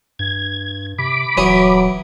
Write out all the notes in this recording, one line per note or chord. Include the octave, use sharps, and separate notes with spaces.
G2 G#6
C3 B5 D6
D#1 E3 F#3 C#5 D#6